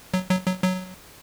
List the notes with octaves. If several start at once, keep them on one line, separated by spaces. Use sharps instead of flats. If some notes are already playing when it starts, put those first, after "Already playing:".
F#3
F#3
F#3
F#3